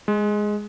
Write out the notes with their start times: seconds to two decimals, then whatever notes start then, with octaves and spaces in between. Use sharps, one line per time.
0.08 G#3